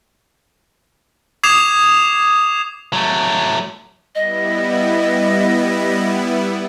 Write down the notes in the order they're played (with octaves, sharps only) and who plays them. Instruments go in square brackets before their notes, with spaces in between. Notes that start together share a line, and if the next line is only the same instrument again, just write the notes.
[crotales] D6 D#6 G#6 C7 E7 F7
[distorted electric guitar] F#3 A3
[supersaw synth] G3 B3 E4 [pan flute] D#5